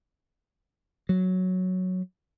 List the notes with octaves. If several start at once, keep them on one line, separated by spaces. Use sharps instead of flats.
F#3